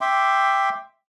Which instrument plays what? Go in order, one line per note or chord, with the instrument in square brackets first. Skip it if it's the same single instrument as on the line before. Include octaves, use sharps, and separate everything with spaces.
[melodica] E5 G5 C6 D6